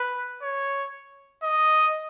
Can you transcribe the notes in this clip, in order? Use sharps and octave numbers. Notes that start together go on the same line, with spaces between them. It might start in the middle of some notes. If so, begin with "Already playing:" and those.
Already playing: B4
C#5
D#5